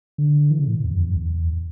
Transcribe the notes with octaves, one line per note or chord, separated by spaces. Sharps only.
D3
E3
C#3
A2
E2
F#2
E2
F#2
E2